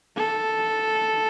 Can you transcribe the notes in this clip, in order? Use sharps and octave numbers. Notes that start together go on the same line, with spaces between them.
A4